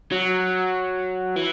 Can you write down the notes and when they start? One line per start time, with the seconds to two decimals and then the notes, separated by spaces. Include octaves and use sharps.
0.12 F#3
1.36 E3